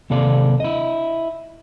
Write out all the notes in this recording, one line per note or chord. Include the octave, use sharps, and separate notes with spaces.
D#2 C3 A4 D5 F5
E4 D#5